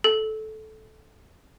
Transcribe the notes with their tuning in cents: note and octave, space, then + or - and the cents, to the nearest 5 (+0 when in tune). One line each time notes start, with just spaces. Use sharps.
A4 -15